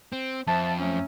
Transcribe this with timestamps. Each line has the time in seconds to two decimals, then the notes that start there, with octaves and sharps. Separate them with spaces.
0.13 C4
0.47 F2 C5 E5 A5
0.79 F#3 A3 C#4